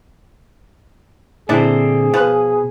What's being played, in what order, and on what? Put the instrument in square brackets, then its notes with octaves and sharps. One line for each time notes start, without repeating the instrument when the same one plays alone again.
[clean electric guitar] A#2 D3 C4 [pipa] D4 E4 [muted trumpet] G#4
[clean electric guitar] B2 [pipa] F3 B4